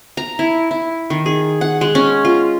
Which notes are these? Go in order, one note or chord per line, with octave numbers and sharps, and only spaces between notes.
A#5
E4
E4
D#3
G#4
F#5
G#3
C#4
F4